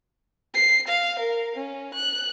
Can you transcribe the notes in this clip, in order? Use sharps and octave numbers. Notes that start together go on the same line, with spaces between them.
C7
F5
A#4
C#4
F#6